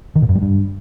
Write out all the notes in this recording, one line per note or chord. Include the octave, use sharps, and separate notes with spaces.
D#3
A#2
F#2
G3
G2